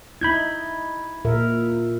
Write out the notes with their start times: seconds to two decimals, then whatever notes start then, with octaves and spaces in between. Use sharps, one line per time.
0.21 D#4 E4 B5 G6 G#6
1.25 A#2 A#4 E5